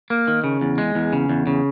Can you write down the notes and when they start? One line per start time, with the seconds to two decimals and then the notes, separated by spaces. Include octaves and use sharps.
0.10 A#3
0.28 D#3
0.44 C#3
0.61 E2
0.78 G#3
0.95 E2
1.13 C#3
1.29 E2
1.47 C#3